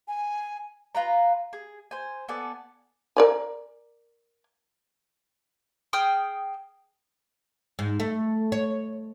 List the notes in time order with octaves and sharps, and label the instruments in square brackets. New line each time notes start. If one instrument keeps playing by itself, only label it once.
[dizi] G#5
[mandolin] F4 B4 A#5
G#4
C5 G#5
B3 A4 D5 G#5
[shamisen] A#4 D5 G#5
[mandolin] G#4 G5 D#6 F6
[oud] G#2
A3
C#5